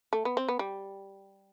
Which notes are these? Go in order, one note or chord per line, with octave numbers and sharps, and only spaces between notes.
A3
B3
C4
B3
G3